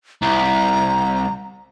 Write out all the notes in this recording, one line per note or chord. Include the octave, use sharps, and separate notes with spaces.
C2 A#5